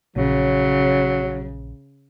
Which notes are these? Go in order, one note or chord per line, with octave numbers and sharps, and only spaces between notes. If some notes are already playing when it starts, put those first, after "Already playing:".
A#1 C#3 F#3